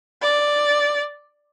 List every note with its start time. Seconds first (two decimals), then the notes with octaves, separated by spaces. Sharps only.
0.22 D5